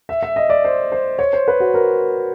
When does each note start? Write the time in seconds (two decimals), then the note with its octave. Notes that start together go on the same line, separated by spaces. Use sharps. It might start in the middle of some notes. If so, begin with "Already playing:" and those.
0.09 E5
0.23 E5
0.36 D#5
0.50 D5
0.64 C5
0.92 C5
1.19 C#5
1.33 C5
1.48 B4
1.60 F#4
1.74 A#4